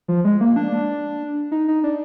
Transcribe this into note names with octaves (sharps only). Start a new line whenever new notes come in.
F3
G#3
A#3
D4
D#4
D#4
D4